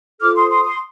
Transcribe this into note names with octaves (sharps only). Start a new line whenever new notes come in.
F4 A4 C5 D6 F6
C6 D#6
C6 D#6
C6 D#6